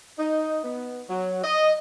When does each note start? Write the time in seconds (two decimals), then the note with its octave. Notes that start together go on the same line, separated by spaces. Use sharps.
0.19 D#4
0.64 B3
1.09 F#3
1.44 D#5